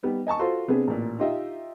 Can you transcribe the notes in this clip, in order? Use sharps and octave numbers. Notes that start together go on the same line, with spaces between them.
G3 B3 D#4
D#5 G#5 A5 C#6
F4 F#4 A4 C5 C6
C3 B3 C4 D4 G#4
A1 A#2
D#4 F4 G4 D#5 E5